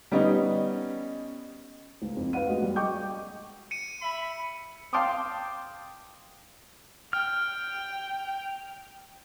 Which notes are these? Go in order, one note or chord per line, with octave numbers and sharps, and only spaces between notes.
G3 B3 C#4 D#4
C#2
F2
B4 F5 F#5 D#7
G#3 D4 F#4 D#5
G3
D#5 G5 C#6 D6 G6
C#7 D#7
E5 B5
F5 G5 A5 C6 D6 D#6
G5 F6